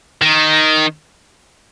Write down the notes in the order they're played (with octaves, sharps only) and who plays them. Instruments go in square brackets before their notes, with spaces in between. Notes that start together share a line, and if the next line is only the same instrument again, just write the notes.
[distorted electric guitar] D#3